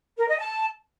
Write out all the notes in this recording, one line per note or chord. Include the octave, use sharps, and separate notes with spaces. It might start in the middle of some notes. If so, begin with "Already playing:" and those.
A#4
D#5
A5